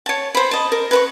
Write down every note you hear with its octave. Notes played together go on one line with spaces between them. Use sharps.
C#5 A5
C5 B5
D#5 A5
A#4
B4 A#5 C#6